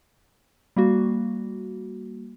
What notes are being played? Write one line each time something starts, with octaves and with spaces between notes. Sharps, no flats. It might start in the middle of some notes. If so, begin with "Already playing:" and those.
G3 A#3 F#4